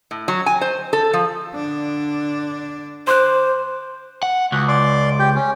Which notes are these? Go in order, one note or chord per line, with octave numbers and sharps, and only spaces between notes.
A2
F#3
G#5
C5
A4
F3
D3 D4
C5 C6 D6 F#6
F#5
C#2 F#4
D5 C6 D6
G4 G5
C#4